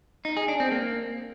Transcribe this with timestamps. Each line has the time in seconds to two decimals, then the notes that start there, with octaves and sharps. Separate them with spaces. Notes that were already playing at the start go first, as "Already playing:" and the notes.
0.25 D#4
0.37 G#4
0.48 D4
0.60 C4
0.72 A#3